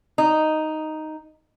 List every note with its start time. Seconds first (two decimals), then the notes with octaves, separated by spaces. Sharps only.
0.18 D#4